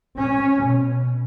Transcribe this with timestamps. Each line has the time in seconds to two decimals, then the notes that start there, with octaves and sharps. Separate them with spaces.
0.18 C#4
0.66 B2